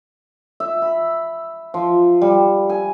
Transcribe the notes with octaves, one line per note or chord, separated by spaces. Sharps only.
E5
B5
F3
G3
G#5